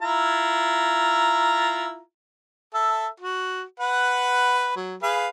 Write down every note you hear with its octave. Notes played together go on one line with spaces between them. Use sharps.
E4 F4 A#5
A4 E5
F#4
B4 F#5
F#3
G#4 B4 F5